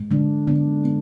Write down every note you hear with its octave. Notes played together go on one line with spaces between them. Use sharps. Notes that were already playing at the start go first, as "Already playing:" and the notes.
Already playing: G#2
G#2 D3 D4
D3 B3 D4
B3